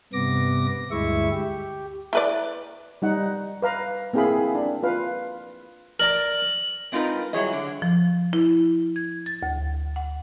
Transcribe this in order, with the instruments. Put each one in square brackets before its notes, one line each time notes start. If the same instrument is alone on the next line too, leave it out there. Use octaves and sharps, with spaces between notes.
[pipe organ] G2 C3 B3 D6 A#6
D2 G2 G#3 E4 E5 C#6
G4
[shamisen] E4 B4 D5
[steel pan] G3 D#4 F#5
B4 F5 A#5
A#3 C4 E4 G#4 F5 B5
D4
F4 B4 F5
[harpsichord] A#4 D5 A#5 [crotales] F#7
[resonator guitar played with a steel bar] G#3 C4 D#4 F4 A#4 B4
F#3 G3 E4 G#4 C#5 D#5
D3
[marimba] F3
E4
G#6
A6
D2
F#5